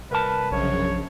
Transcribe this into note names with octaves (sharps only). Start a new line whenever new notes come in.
C2 A#4 B4 A5
A#1 F#2 C#3 C#5